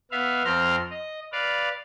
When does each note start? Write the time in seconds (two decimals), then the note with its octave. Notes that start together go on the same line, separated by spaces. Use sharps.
0.11 B3 E5 F5
0.45 F2 C4 A#5 C6 F6
0.90 D#5
1.32 B4 D5 F5